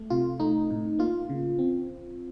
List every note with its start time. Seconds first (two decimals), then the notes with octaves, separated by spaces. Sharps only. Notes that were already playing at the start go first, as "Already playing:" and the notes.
Already playing: A3
0.10 C3 F4
0.40 A3 D#4
0.70 A2
0.99 A#3 F4
1.29 C#3
1.59 C4